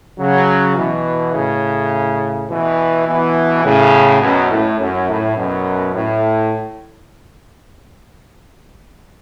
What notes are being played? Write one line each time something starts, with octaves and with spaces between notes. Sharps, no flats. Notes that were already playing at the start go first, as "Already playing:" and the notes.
C#3 F#3
B2 E3
A2 C#3
B2 E3
B2 E3
A2 C#3
F#2 B2
A2
F#2
A2
F#2 B2
A2